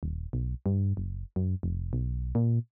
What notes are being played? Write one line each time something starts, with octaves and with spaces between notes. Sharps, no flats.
D#1
B1
G2
F#1
F#2
F1
B1
A#2